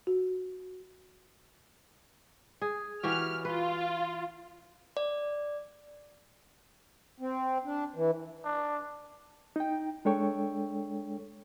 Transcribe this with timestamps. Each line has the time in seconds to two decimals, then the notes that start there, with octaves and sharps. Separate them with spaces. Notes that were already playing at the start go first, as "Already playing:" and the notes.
0.07 F#4
2.62 G#4
3.03 E3 F#4 G4 F6
3.45 F4 B4
4.97 D5
7.20 C4
7.65 D4
7.96 E3
8.44 D4
9.56 D#4 G5
10.05 G#3 D4 A4 C#5 G5 C#6